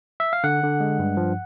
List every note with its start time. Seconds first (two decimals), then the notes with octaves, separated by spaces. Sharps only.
0.20 E5
0.33 F5
0.44 D3 F#5
0.63 D3
0.80 G#3
0.99 G2
1.17 F3